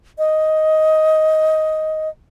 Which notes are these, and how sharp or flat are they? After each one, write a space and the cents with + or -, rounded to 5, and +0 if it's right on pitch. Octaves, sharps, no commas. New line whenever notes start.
D#5 +10